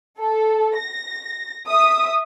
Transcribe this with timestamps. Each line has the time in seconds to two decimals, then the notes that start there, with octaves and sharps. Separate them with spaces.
0.18 A4
0.76 A#6
1.67 E5 D#6